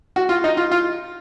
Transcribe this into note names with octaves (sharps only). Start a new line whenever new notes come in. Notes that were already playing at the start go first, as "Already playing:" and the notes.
F#4
F4
D#4
F4
F4